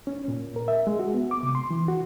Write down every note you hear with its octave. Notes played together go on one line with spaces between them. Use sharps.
C#4
A#2
A#4
E5
G#3
F#4
B3
D6
C3
C6
E3
F#4